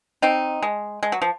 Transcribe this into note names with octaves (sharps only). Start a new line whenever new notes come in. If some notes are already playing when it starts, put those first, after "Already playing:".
C4 D#4
G#3
G#3
F#3
F3